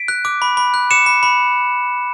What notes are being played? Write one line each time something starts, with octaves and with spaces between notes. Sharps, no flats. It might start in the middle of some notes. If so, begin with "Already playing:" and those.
Already playing: B6 D7
F#6
D6
B5
B5
F#6
D6 C#7 E7
B5
B5